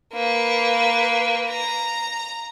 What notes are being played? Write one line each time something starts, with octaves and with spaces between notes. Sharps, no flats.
A#3 B4
A#5